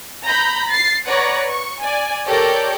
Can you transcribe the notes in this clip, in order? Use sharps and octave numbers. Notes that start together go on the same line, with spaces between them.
A#5 B5 G6
A6 C7
B4 C#5 D5 F#5 A#5
C#6
D5 G#5
G4 A4 A#4 C#5 D5 G6